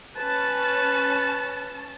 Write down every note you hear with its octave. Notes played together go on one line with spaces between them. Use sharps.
C#4 B4 A5